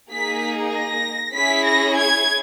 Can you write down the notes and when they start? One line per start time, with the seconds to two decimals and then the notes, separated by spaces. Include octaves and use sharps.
0.11 A#3 D#4 G#4 B6
0.73 A#6
1.34 C#4 E4 G#4 B6
1.65 A#6
1.97 G#6